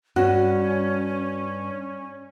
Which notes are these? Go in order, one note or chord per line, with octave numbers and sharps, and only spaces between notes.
G2 C#4 F#4